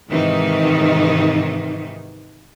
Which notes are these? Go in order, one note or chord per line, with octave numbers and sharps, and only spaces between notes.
G#2 C3 D#3 E3 D#4